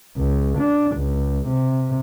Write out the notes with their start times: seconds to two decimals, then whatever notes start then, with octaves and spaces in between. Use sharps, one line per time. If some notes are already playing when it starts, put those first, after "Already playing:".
0.17 C#2
0.58 D4
0.96 C#2
1.48 C3